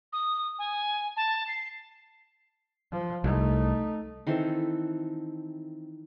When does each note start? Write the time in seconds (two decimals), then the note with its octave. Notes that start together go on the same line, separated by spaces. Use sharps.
0.13 D#6
0.59 G#5
1.17 A5
1.48 C7
2.92 F3
3.24 C2 A3 D#4
4.27 D#3 E3 C4 A4